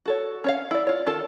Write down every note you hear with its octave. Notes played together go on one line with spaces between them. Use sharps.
F#4 A4 C#5
C#4 C#5 F5
E4 D5
F4 C#5
D#3 F4 A4 A5